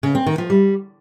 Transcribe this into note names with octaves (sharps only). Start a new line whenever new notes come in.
C#3
C4
D#3
F3
G3